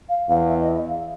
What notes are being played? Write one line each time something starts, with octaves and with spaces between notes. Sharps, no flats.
F5
E2 F5
E5
D#5
E5
F5